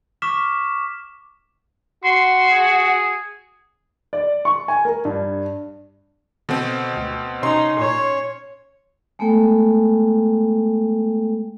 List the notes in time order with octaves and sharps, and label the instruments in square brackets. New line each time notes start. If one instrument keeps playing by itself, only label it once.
[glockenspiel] C#6 D6 F6 B6 E7
[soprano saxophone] F#4 [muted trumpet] C6
[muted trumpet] G#4
[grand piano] D5
C#6
G#5
A#4
G2
[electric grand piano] B2 C4 [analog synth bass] D3
[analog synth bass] D2
[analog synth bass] C3 [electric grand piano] C#4 C6 [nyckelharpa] D#4
[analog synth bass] A#2 [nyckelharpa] C#5
[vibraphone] G#3 A3 B3 A4 G5